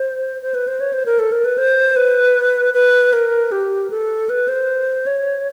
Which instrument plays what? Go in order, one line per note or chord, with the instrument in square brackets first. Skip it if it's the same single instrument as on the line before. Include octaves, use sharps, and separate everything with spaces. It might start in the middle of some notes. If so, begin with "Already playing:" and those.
Already playing: [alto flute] C5
C5
B4
C5
C#5
C5
A#4
A4
A#4
B4
C5
B4
B4
A#4
G4
A4
B4
C5
C#5